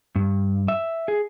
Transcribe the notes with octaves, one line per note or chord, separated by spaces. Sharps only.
G2
E5
G#4